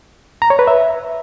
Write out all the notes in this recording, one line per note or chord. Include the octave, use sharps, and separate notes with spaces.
A#5
C#5
B4
E5